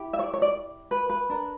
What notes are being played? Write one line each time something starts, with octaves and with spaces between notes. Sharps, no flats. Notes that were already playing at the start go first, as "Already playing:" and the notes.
Already playing: E4 G4
E5
C#5
D5
C#5
D5
B4
B4
D4 A#4